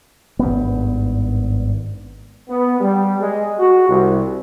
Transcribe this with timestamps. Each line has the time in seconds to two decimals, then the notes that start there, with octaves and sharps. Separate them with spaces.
0.39 G#1 G2 B3
2.49 B3
2.80 G3
3.19 G#3
3.58 F#4
3.88 C2